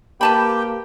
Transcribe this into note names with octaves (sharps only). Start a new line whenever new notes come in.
A#3 G4 B4 G5 A5 B5